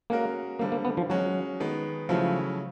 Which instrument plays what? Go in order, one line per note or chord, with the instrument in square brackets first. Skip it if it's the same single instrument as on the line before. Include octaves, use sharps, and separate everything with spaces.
[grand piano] G#3 C#4 F#4 A#4 [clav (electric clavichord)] A#3
[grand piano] D3 G3 C4 [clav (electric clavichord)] A#3
[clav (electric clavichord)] A#3
B3
F3
[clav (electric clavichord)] F#3 [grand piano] G#3 C#4 F#4
[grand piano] D#3 G#3 B3
[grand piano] C#3 F#3 A3 C#4 E4 [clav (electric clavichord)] F3